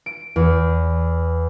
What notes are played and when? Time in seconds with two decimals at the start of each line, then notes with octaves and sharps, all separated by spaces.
0.06 D7
0.36 E2